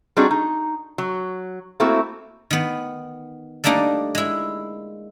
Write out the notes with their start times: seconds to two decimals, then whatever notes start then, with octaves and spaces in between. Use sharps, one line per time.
0.17 G3 C4 D4 D#4 F#4 G#4
0.31 D#4
0.98 F#3
1.80 A3 A#3 C4 E4 F#4 A4
2.51 D#3 B3
3.64 G3 A3 A#3 D4 D#4
4.15 G#3 E4